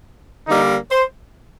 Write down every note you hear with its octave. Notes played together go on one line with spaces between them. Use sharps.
D3 G3 A#3 D#4
C5